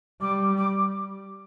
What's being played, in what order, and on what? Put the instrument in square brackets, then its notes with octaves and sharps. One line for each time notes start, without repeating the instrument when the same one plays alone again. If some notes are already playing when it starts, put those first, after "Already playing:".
[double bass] G3 [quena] D6
[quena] D6